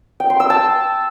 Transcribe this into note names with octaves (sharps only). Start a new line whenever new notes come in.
G5
C6
E6
A5